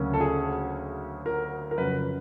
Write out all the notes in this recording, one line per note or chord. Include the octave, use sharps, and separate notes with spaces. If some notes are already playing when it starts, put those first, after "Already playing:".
Already playing: D2 C#3 F#3 A#3 C#4
A4
G#4
A#4
A#4
F2 C#3 F#3 B4